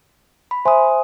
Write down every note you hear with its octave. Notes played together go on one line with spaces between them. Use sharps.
B5
C5 E5 G#5 C6 D#6